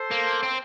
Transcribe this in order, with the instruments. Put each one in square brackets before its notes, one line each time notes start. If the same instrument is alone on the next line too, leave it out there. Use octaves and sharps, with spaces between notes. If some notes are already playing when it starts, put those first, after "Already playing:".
Already playing: [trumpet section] A4 C5
[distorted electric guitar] A#3
C4